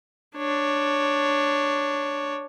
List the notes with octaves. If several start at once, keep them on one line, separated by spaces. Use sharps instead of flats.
D4 C#5